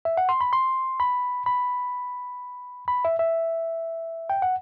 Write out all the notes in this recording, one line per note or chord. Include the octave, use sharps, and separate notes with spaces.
E5
F#5
C6
B5
C6
B5
B5
B5
E5
E5
G5
F#5